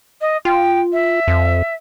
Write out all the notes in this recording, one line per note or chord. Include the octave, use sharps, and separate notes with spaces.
D#5
F4 G5
E5
F2